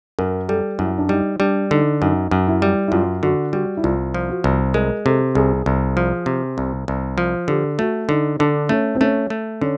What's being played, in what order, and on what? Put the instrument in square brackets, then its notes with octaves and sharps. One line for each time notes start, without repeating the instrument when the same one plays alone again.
[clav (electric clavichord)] F#2 [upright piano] A#4
[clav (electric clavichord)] G3 [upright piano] A4
[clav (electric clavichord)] F#2 [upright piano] E4
[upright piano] D4
[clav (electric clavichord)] G3 [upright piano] D#4
[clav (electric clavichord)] G3 [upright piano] D4
[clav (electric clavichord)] D3 [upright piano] D#4
[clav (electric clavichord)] F#2 [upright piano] D#4
[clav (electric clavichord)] F#2
[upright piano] E4
[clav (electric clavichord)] G3
[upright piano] E4
[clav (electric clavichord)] F#2 [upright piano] F4
[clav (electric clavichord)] D3 [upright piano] F#4
[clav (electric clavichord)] G3 [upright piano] F#4
[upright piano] E4
[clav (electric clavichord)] C2 [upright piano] F4
[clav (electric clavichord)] F3
[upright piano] F#4
[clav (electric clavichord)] C2
[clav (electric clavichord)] G#3 [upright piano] A#4
[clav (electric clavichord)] C3 [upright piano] A4
[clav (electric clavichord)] C2 [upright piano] G#4
[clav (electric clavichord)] C2
F3
C3
C2
C2
F3
[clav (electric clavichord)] D3 [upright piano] G4
[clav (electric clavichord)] A3 [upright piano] F#4
[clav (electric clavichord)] D3 [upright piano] D#4
[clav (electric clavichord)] D3 [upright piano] D4
[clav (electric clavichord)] A3 [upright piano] C#4
[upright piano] C4
[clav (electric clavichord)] A3 [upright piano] C#4
[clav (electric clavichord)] A3
[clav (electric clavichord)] D3 [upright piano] C#4